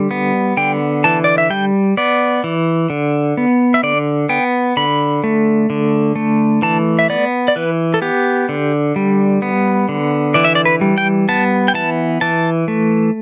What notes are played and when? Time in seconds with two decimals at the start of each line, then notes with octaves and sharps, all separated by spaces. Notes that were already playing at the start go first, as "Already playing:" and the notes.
Already playing: D3 G3
0.11 B3
0.57 D3 G5
1.04 E3 A5
1.24 D5
1.38 E5
1.50 G3 G5
1.97 B3 D5
2.44 E3
2.90 D3
3.37 B3
3.74 E5
3.83 D3 D5
4.29 B3 G5
4.77 D3 B5
5.24 A3
5.70 D3
6.16 A3
6.62 E3 A5
6.99 E5
7.10 B3 D5
7.48 D5
7.56 E3 B4
7.94 A4
8.02 B3 G4
8.49 D3
8.96 G3
9.42 B3
9.89 D3
10.34 E3 D5
10.44 E5
10.55 D5
10.65 B4
10.81 G3
10.98 G5
11.29 B3 A5
11.68 G5
11.74 E3 A5
12.21 E3 A5
12.68 A3